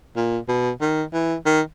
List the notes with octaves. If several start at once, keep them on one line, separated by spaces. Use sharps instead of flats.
A#2
B2
D#3
E3
D#3